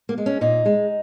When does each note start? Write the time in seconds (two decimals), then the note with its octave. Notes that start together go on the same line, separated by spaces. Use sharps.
0.09 A#3
0.18 G#3
0.26 C#4
0.41 A#2 D#4
0.65 G#3